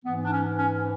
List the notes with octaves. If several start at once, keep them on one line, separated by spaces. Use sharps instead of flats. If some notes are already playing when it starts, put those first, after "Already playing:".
G#2 E3 B3
D4
C#4
C#4